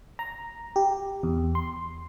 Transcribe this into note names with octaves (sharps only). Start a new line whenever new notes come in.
A#5
G4
E2
C6